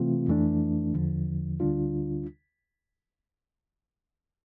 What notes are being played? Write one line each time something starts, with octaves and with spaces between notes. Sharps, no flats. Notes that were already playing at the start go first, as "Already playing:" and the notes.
Already playing: C3 E3 A3 C4 F4
F2 E3 A3 D4
E2 D3 F3
D2 D3 G3 D4 F4